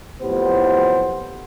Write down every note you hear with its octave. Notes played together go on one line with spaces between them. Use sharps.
F2 A2 F#3 B3 G4 C5